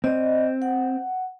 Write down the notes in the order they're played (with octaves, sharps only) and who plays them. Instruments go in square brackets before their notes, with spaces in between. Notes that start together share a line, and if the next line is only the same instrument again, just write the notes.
[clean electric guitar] C4 [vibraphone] D5 D#5
[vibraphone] F#5